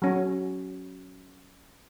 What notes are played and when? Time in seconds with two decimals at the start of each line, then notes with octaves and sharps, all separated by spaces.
0.02 F#3 C#4